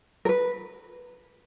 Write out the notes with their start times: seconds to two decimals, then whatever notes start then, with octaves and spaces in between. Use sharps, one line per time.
0.25 A#4
0.29 B4